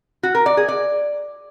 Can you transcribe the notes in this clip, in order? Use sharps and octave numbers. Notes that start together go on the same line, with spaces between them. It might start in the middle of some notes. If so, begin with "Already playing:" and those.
F#4
A#4
D5
G#4
D5